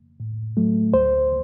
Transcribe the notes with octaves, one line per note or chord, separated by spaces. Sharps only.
A2
F#3 A3
D2 C5